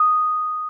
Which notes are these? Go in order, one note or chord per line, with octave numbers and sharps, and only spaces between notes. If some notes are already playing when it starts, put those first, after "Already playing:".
Already playing: D#6